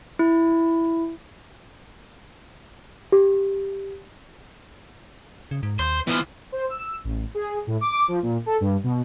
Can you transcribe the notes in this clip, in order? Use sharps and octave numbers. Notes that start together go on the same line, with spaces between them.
E4
G4
C#3
G#2
D#2 C5
E3 F3 B3
C5
E6
A1
G#4
A2
D6
F3
A#2
A4
G2
B2